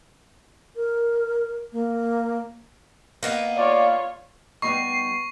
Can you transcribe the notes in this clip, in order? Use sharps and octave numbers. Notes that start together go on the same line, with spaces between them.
A#4
A#3
A#3 B3 D#4
F4 C#5 D5
G3 B3 D#4 C#6 C7